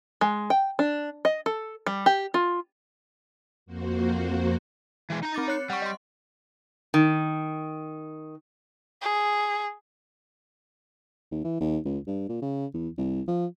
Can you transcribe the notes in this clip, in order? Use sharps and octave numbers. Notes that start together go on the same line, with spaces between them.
G#3
G5
D4
D#5
A4
G3
G4
F4
F2 A#3 F#4 C5
E3 G#3
D#4 A#5
C4 D6 A6
C#5 F#6 C#7
G3 F#5 C#6
D#5 C6
D#3
G#4
D#2
E3
D#2
C#2
G2
A#2
C#3
E2
C2
F3